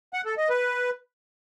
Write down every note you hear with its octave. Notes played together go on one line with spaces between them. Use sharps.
F#5
A4
D#5
B4